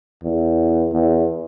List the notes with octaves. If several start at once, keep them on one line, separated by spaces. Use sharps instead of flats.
E2
E2